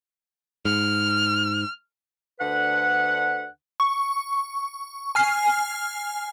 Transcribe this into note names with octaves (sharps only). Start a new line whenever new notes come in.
G#2 F6
D2 D3 B4 F#5
C#6
G#5 F6 C7